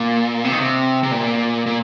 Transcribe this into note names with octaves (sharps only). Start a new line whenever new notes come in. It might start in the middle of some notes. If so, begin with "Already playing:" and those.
Already playing: A#2
C3
D#3
C3
C3
A#2
A#2